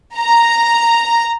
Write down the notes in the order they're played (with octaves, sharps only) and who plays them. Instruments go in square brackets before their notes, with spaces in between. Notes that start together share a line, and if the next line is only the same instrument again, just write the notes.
[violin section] A#5